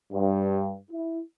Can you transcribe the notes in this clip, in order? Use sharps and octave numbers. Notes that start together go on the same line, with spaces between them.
G2
E4